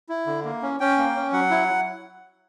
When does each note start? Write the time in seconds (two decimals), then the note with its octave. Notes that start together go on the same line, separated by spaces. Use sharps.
0.09 E4
0.27 D3
0.45 A#3
0.62 C#4
0.80 C#4 G5
0.98 A#3
1.15 C#4
1.33 F#3 F#5
1.51 E4